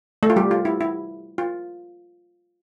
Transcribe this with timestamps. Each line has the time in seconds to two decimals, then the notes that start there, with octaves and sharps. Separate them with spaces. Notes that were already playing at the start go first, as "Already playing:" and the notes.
0.23 A3 A4
0.30 F4
0.36 G3 G4
0.51 F4
0.65 E4
0.81 E4
1.38 F4